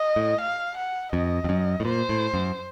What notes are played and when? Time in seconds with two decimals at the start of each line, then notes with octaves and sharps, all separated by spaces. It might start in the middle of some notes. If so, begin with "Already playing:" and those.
Already playing: D#5
0.16 A2
0.41 F5
0.77 F#5
1.12 F2 D#5
1.44 F2
1.49 F#2
1.80 A2
1.85 A#2 C5
2.09 A2
2.34 F#2